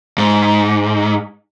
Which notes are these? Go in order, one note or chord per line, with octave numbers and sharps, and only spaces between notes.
G#2